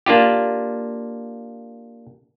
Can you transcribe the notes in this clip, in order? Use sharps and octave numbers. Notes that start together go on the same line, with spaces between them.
A#3 D4 F4 G4